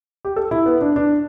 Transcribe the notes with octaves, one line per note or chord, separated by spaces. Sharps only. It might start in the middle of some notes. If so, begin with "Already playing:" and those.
G4
A4
E4
B3
D4
D4